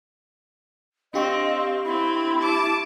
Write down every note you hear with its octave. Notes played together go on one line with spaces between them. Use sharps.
C4 D4 G4 D#5 F5 C#6
C4 E4 B5
A5 D6